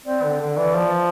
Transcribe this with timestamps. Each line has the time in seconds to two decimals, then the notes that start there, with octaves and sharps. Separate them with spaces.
0.06 C4 D5
0.24 D3
0.41 D3
0.57 E3
0.75 F3